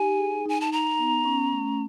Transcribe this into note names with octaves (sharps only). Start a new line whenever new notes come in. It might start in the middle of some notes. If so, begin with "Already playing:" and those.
Already playing: D#4 G4 G#5
G#4
D#4 G#5
A5
D#4 A#5
B3
C#4
A3